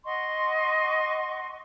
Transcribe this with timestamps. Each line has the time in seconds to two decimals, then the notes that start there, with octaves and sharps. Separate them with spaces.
0.04 D#5 F#5 C6 C#6